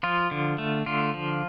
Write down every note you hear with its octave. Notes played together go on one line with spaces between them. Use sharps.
F3 F4
D3
A3
D3 F4
F3